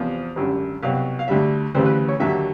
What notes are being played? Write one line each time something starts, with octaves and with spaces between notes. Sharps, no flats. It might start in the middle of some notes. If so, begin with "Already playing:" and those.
Already playing: E2 C3 F3
G#1 F#2 D3 G3
C2 B2 F#3 F5
F5
D2 D3 G3 E5
D2 C#3 E3 G3 C5
B4
C#5
D#2 D3 F#3 E5